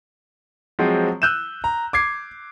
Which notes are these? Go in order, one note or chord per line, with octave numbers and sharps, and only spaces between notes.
F3 F#3 G#3 C4
E6 F#6 G6 D#7 E7
A#5
D6 G#6 C7